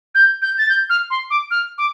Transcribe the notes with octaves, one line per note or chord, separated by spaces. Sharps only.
G6
G6
A6
G6
F6
C6
D6
F6
D6